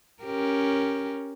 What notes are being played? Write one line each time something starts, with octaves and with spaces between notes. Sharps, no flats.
C#4 G4 A#4